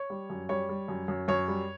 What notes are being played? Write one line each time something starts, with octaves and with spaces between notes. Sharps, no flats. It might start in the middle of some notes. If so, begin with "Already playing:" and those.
Already playing: C#5
G3
F#2
G3 C#5
G3
F#2
F#2
F#2 C#5
G3